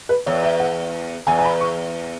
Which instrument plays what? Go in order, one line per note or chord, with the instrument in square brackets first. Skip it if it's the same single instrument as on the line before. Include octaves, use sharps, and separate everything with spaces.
[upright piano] B4
[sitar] E2 [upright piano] C#5
[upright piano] E5
F#5
[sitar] E2 [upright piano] G#5
[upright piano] G#5
B5
C#6